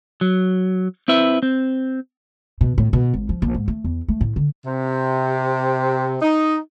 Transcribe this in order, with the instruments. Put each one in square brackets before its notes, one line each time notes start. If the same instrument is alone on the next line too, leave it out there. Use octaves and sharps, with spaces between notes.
[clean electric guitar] F#3
C4 E4 B4 E5
C4
[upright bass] B2
A2
B2
G#1
F3
A#1
G#2
A3
E2
A3
A2
D3
[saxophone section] C3
D#4